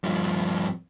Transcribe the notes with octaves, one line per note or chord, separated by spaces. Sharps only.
G2 F3